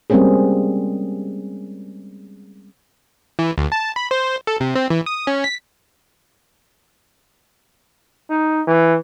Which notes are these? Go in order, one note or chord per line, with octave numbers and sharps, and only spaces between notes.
G3 G#3 A#3 C4 C#4 G#4
E3
D2
A5
B5
C5
A4
C3
C4
E3
D#6
C#4
B6
D#4
E3